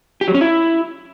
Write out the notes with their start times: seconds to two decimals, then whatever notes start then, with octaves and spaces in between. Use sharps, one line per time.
0.21 G4
0.28 F#3
0.34 C#4
0.41 E4